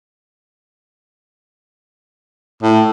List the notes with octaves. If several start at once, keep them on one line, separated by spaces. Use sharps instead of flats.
A2